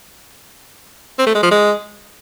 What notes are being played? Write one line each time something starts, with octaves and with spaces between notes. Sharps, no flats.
C4
A3
G#3
F3
G#3